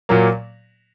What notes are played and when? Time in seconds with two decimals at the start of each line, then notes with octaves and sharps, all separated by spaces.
0.09 A#2 F#3 A#3